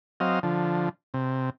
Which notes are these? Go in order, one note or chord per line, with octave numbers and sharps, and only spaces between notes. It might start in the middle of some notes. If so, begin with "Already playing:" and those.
F#3 C4 D#5 F5
D3 F3
C3